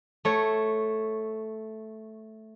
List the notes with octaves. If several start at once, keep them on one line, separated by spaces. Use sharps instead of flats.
A3 C#5